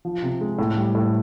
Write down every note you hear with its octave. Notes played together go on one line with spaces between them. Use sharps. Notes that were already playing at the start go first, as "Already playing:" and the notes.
F3
C3
G#3
A2
G3
A2